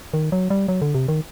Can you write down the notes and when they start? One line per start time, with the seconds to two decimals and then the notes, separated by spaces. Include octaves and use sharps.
0.14 D#3
0.32 F#3
0.50 G3
0.68 F#3
0.82 D3
0.95 C3
1.08 D#3